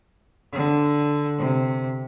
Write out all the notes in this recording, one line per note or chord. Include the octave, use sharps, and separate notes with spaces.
D3
C3